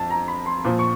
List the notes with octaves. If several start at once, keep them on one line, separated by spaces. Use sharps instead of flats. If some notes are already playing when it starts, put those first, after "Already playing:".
Already playing: F2 A5
A#5
B5
C6
A#2 F3
C#6